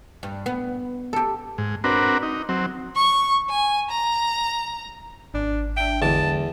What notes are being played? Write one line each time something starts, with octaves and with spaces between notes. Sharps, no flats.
G2
B3
G4 A4
G#2
C4 D4 F#4 A#4 B4
D#4
F#3 C4
C#6
G#5
A#5
G#1 D4
D4 E5 G5
E2 D3 F#3 G#3 A5